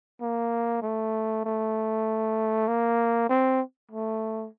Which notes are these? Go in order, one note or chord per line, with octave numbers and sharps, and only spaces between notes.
A#3
A3
A3
A#3
C4
A3